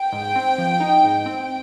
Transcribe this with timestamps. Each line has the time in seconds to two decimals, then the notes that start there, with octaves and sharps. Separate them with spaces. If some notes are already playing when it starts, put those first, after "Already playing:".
Already playing: G5
0.12 G#2
0.36 C4
0.58 F3
0.80 D#4
1.03 G#2
1.26 C4